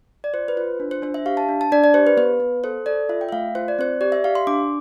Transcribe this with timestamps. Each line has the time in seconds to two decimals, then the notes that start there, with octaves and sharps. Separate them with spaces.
0.24 D5
0.34 F4 C5
0.48 B4
0.57 F4 C5
0.80 D4
0.91 C5
1.02 D4 C5
1.14 E5
1.26 G4 F5
1.37 A5
1.49 D4
1.61 A5
1.72 D4 D5
1.84 D5
1.94 G4 C5
2.07 B4
2.17 B3 B4
2.40 B3
2.64 A4 C5
2.86 A4 D5
3.09 F4 E5
3.21 G5
3.29 E5
3.32 A3 F5
3.55 F4 C5
3.68 D5
3.79 C4 C5
4.01 G4 D5
4.12 E5
4.24 G4 F5
4.35 C6
4.47 D4 D6